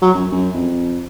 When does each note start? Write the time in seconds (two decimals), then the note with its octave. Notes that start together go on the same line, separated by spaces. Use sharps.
0.02 F#3
0.14 F#2
0.32 F#2
0.54 F2